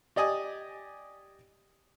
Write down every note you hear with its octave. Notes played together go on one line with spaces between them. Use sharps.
G4 D5 D#5 G#5 D#6